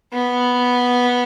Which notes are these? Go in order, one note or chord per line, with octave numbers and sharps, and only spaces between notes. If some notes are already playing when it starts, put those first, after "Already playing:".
B3